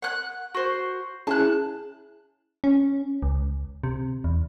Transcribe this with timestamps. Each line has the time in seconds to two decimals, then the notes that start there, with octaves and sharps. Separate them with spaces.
0.02 F#5 F#6
0.55 F#4 C5
1.27 C#4 E4 G#4 A5 F#6
2.64 C#4
3.22 C#2
3.84 C3
4.24 E2